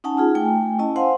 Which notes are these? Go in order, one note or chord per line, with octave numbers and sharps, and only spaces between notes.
C#4 D#4 F#5 G#5 A5
D#4 F4 G#4
A3 G5 G#5
C#4 E4 D#5 A5
C5 F5 F#5 G#5 C6